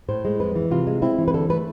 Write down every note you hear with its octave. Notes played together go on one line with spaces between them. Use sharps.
A2 C5
G#3
F2 B4
E3
C3 F4
G#3
C4 E4
E3
B4
D3 A4
A3 B4